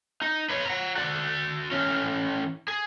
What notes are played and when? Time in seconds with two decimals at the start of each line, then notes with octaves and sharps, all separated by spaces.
0.22 D#4
0.50 B4 C#5
0.66 F#5 A#5
0.97 F#4 D5
1.71 E3 C#4
2.68 G#4